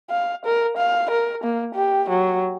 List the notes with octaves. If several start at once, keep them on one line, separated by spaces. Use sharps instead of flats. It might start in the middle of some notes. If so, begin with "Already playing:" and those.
F5
A#4
F5
A#4
A#3
G4
F#3